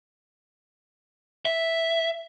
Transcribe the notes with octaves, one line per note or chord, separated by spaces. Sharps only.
E5